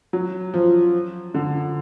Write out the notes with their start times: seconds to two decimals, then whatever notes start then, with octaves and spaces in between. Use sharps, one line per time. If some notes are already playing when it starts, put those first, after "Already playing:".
0.13 F#3
0.54 F3
1.34 D3